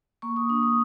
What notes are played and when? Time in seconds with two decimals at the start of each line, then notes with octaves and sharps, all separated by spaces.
0.22 A#3 C#6
0.36 D#6
0.49 D4 D#6
0.63 D#6